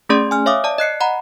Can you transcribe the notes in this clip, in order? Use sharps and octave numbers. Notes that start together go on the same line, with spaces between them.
A3 C#4 G#4 D5 C6
G#5 F6
C#5 E5 F5 D6 D#6
D5 A5
D#5 F#6 C7 C#7
F#5 A#5 B5